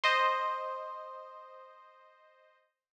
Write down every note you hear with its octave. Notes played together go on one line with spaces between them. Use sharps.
C5 D#5